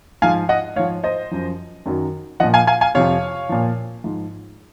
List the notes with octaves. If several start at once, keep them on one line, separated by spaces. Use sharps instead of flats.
G#2 F3 F5 G#5
D#5 F#5
G#2 F3 C#5 F5
C5 D#5
F#2 F3
F#2 D#3 F#3
A#2 F3 D#5 F#5
F5 G#5
F5 G#5
F5 G#5
F2 C3 F3 C#5 F5
A#2 F3
G#2 F3